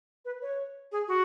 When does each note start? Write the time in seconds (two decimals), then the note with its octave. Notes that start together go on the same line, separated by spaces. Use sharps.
0.25 B4
0.42 C#5
0.92 G#4
1.08 F#4